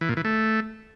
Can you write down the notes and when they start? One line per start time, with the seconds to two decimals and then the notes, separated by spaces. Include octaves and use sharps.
0.01 E3
0.09 A#2
0.17 E3
0.25 A3